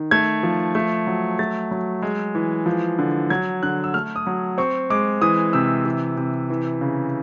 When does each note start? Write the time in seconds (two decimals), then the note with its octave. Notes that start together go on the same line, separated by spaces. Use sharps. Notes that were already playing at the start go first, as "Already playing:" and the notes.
Already playing: D#3
0.11 A3 G#6
0.43 F3
0.75 A3
1.07 F#3
1.39 A3 A6
1.71 F#3
2.02 G#3
2.35 E3
2.66 F3
2.99 D3
3.30 F#3 G#6
3.63 D3 F#6
3.84 E6
3.94 A3 F6
4.16 D#6
4.27 F#3
4.58 C4 C#6
4.90 G#3 D6
5.22 E3 D#6
5.53 C3 E6
5.85 E3
6.17 C3
6.50 E3
6.81 C#3